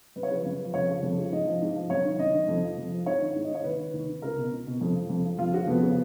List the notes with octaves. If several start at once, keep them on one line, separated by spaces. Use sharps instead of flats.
F#2 B4
C#5
C#3 F3 B4
F#2
C#3 F3
F2 C#5
C#3 F3
F2
C#3 F3
G#2 D#5
F3
G#2
F3
F#2 C#5
D#3
F#2 D#5
D#3
F2
F3
F2
F3
G#2 C#5
D#3
G#2
D#5
D#3 C#5
D#2 B4
D#3
D#2
D#3
C#2 A#4
B2
C#2
B2
F2
F3
F2
F3
F2 F4
C#3 F3 F#4
F2 B3
C#3 F3